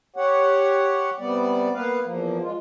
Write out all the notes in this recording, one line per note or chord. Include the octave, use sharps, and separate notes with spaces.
G4 C#5 F#5
C3 G3 B3 D5
A#3 B3 B4 F5
E2 F3 A#3
G#3 F4